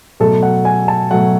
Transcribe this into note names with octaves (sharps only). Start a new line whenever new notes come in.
B2 F#3 A3 A4
F#5
G#5
A5
B2 F#3 A3 F#5